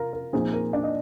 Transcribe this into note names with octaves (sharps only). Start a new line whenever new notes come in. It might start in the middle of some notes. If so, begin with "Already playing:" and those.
Already playing: C3 F4 A#4
A#4
A#2 F3 C4 D#4 G#4
A#4
D4 D5
D#5